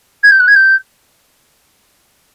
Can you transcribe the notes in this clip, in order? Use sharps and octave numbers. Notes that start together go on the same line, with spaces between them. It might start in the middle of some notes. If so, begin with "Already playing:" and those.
G#6
G6
F#6
G#6
G6